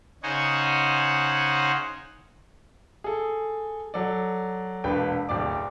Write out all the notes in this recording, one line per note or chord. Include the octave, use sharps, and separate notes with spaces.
C#3 D#4 C5 C#5 F#5 G#5
G#4 A4
F#3 A4 D5
E1 A#1 B4 G5
D1 F2 D5 D6